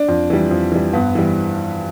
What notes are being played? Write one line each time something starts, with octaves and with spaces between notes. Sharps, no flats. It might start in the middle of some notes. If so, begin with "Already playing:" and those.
Already playing: D4
F2
E3 G3
F2
E3 G3
G2 B3
E3 G3